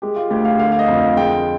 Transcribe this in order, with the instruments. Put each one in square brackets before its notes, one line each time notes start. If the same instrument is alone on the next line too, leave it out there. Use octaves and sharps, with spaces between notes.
[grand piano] G#3 G4
F4
D2 G4
F5
D3 F5
F5
D#5
F2
F5
G#3 G5